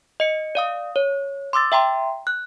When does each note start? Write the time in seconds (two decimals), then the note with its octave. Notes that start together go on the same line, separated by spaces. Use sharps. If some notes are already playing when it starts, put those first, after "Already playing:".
0.20 D#5 C#7
0.55 D5 F5 D#6
0.96 C#5
1.53 C6 D6 E6 A6
1.72 E5 G5 A#5 C6
2.27 F#6